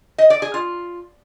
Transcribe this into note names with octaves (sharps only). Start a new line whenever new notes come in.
D#5
D5
G#4
F4